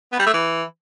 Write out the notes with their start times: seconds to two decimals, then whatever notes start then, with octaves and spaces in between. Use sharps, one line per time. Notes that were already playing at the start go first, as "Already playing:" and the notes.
0.12 B3
0.19 G3
0.26 A3
0.33 E3